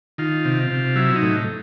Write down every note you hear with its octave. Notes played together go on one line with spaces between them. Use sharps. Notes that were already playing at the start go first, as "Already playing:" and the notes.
D#3 F4
C3
C3
F#3 E4
D#4
A2